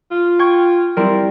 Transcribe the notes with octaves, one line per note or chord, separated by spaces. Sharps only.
F4
G5 C#6 G#6
G3 C4 E4 A#4